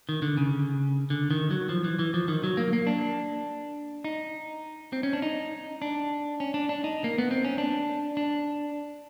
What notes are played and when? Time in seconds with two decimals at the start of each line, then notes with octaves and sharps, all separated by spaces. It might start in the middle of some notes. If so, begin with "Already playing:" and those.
0.09 D#3
0.22 D3
0.37 C#3
1.10 D3
1.31 D#3
1.51 F#3
1.69 F3
1.84 E3
1.99 E3
2.14 F3
2.28 D#3
2.44 F#3
2.57 A#3
2.73 A#3
2.87 D4
4.04 D#4
4.93 C4
5.03 C#4
5.13 D4
5.22 D#4
5.82 D4
6.40 C#4
6.54 D4
6.69 D4
6.84 D#4
7.04 A#3
7.18 B3
7.31 C4
7.45 C#4
7.58 D4
8.17 D4